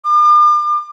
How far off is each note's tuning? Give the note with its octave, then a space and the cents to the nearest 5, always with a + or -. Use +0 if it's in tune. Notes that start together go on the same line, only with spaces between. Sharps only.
D6 +40